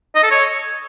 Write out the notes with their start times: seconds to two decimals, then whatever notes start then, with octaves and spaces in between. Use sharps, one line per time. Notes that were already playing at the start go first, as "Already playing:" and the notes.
0.15 D#5
0.23 A4
0.31 C#5